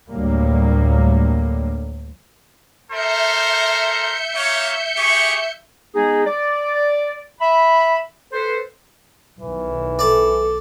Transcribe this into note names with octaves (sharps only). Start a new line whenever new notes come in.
D2 A2 D3 F#3 G3 A#3
A4 A#4 C5 E5 G6 C#7
A#3 C#5
G4 G#4 C#6
G#3 B3 D#4 G#4
D5
E5 B5
A4 B4 C5
B1 D#3 E3
A4 D5